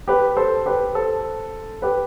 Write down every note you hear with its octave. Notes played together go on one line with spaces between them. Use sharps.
G4 B4
A4 C5
G4 B4
A4 C5
G4 B4